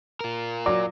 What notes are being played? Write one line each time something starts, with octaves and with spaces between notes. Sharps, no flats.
F4 A#4
F#3 D5 D6